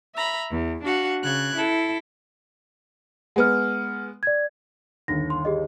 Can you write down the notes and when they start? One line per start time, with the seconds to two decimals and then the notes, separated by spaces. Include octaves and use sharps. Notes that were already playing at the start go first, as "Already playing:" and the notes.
0.15 E5 A#5 B5
0.51 E2
0.83 D4 F#4 F5 F#5
1.21 C#3 F#6 G#6
1.55 E4 A4
3.36 G#3 B3 F#5 F6
4.23 D5 G#6
5.08 G1 D#2 A#6
5.30 C6
5.45 G4 G#4 D#5